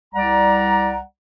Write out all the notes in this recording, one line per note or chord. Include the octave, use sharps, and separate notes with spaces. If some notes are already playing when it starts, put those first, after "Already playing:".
C2 G3 D5 F#5 A#5